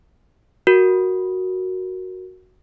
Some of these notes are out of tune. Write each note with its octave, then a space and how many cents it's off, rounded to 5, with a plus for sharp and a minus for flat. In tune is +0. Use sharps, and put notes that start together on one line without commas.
F#4 +0 A#4 +0